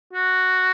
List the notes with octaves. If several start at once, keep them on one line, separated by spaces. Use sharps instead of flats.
F#4